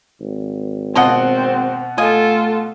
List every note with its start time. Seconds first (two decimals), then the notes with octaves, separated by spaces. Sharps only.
0.21 G#1
0.95 B2 F3 A#3 C4 D#5 F#5
1.98 A3 F4 A4 D#5 G#5